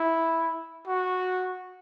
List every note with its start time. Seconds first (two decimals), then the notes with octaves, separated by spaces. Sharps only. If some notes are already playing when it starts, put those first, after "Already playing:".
Already playing: E4
0.87 F#4